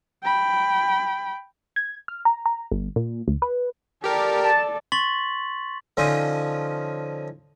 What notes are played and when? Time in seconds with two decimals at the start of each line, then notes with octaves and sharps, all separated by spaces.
0.24 G5 B5
1.76 G#6
2.08 F6
2.25 A#5
2.46 A#5
2.72 G1
2.96 A#2
3.28 D2
3.42 B4
4.04 G4 A4 A#4 D5
4.41 A5
4.92 C6 C#6 A6 B6 F#7
5.97 D3 F3 C#4 D#4 F4